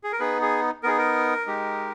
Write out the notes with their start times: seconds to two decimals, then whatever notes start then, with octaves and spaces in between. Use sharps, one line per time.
0.04 G#4
0.12 A#4
0.19 B3 D#4 G#4 B4
0.42 G#4
0.83 B3 D#4 G#4 A#4
0.98 A#4
1.46 G#3 D#4 G4